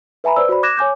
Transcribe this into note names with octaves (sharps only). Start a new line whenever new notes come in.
B4 E5 G#5 A#5 B5
B4 C5 D5 E6
F#4 C5 D5 B5
D6 F#6 G#6 A#6 E7
C#5 G#5 D6 G6